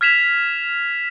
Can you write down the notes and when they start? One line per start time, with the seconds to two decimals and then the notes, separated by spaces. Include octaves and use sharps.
0.01 F6 G#6 B6 E7 F7